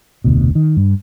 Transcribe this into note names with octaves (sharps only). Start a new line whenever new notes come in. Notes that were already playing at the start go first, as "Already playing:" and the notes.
F1 D2 B2
D#3
G2